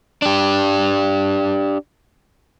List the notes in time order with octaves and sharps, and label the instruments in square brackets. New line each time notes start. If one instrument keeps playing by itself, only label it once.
[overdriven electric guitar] D4 G4